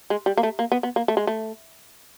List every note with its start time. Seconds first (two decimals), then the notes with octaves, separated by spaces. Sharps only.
0.10 G#3
0.26 G3
0.37 A#3
0.43 A3
0.59 A#3
0.72 B3
0.83 B3
0.96 A#3
1.08 A3
1.17 G#3
1.27 A3